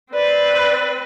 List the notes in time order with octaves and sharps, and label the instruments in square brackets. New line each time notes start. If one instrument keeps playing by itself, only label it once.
[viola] C4 B4 [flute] D5